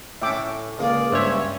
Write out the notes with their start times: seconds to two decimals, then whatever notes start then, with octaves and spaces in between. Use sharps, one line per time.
0.22 A2 C#4 E5 G5 D6
0.78 C#2 A#3 G#4 D5
1.12 G2 G#3 C#4 C5 C#5 E5